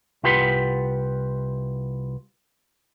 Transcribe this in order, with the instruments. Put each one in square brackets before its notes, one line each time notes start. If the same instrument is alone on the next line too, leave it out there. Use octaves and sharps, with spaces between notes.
[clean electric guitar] C2 F4 G4 B4 F#5 C6